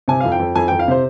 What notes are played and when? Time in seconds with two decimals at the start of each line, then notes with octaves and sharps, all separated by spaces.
0.08 C3 G#5
0.20 F2 F5
0.32 G5
0.39 F2
0.55 F2 G#5
0.68 F2 G5
0.79 F5
0.88 C3 C5